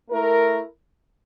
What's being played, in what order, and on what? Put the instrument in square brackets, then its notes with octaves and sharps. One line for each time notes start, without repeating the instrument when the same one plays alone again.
[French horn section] A3 E4 A#4